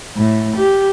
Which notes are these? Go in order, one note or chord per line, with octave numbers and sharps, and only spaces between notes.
A2
G4